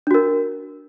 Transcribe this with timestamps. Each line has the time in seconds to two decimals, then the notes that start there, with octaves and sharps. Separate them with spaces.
0.07 D4
0.11 F#4
0.14 A#4